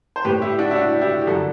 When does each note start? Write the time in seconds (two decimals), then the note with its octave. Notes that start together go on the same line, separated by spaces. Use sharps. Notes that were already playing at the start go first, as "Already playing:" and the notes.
0.16 C5
0.25 A2 G3 G4 B4
0.42 E4 G4
0.58 D4 F#4
0.71 E4
0.76 D4 F#4
1.01 E4 G4
1.22 G4
1.27 F#2 D3 G3 F#4 A4